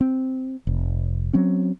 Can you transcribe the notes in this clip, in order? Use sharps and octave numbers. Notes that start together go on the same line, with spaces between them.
C4
F1
F#3 C4 C#4